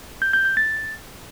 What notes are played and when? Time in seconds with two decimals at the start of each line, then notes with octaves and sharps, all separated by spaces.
0.22 G6
0.33 G6
0.45 G6
0.57 A6